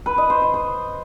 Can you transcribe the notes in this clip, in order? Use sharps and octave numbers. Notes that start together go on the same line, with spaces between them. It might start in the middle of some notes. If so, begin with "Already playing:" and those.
B4
D#5
C5
C5
C5